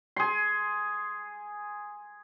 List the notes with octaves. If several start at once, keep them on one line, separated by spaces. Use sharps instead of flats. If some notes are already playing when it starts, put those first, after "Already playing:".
G#4 C6